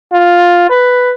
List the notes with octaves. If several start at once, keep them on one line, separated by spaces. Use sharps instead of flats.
F4
B4